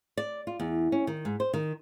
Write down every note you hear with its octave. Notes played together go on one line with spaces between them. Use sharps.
D5
F4
E2
C#4
D#3
G#2
C5
D#3